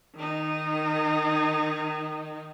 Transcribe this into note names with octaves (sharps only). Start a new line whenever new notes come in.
D#3 D#4